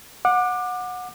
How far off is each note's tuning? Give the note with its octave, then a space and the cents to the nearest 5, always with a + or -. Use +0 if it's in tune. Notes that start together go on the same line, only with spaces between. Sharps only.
F#5 -25 D6 +25